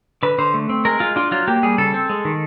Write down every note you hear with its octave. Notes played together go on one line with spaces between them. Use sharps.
D3 B4
D3 C5
A3
C4
G#3 A#4
G#3 F4
D4 F4
F#3 F4
A#3 G4
G3 G#4
C#3 A4
C4
G#3
D#3